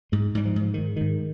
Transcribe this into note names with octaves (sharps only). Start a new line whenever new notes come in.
G#2 G#3
G#2 G3
F3
G#2
F3
G#2 D#3
G#2 D#3